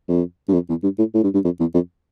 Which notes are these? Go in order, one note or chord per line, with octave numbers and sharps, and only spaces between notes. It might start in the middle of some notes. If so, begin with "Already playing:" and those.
F2
G2
F2
E2
G2
A2
A2
G2
G2
F2
E2
F2